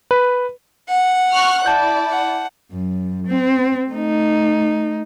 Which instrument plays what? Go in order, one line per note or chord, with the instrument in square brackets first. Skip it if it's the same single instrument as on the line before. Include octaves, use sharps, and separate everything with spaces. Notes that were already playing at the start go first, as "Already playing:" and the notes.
[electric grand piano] B4
[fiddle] F#5
[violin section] C#6 F6 F#6
[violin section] E4 D5 [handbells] A5 G6
[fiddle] F#5
[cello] F#2
C4
A3 D#4